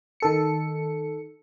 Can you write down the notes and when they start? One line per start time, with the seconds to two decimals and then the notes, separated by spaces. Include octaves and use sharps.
0.20 D#3 A4 C#7